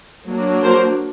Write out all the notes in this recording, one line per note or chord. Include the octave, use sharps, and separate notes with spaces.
F#3 A#3 D4
A#4 C5